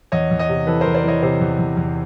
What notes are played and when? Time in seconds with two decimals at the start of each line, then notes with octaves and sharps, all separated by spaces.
0.12 E2 C#5 D#5
0.31 E2
0.39 C#5 D#5
0.49 C3
0.67 E3 A4 B4
0.81 E2 A#4 C5
0.94 C5 D5
1.04 E3 C#5 D#5
1.22 C3 C5 D5
1.41 E2
1.59 E2
1.77 E2